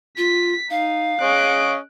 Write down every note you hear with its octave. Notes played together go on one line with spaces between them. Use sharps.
F4 B6
D#4 F5
C#4 G#4 D#5 F#6 D7